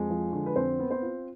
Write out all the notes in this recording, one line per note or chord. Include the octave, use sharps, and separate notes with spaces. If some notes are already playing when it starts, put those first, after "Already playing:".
Already playing: F2 G#3 G#4
F3
D3
B4
F2 C4 C5
B3
C4 C5
F4